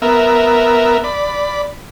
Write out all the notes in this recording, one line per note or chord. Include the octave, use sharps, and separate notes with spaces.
B3 A#4 E5
D5 B5